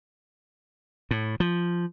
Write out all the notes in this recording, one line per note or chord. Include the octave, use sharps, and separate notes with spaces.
A2
F3